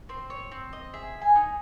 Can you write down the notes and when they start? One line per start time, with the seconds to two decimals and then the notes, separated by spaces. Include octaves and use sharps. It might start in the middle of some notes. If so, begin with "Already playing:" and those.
0.09 C4 C5
0.30 C#5
0.51 C4
0.73 D#5
0.93 G#4 E5
1.21 G#5
1.36 D#4